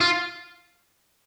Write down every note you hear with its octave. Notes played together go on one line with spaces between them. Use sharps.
F4